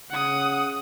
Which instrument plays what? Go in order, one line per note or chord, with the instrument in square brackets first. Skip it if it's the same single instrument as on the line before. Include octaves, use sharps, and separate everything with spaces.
[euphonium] C#3 [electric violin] F#5 D#6